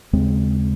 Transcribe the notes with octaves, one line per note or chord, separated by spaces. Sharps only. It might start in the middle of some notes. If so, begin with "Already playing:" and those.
D#2 C#3 G#3 C4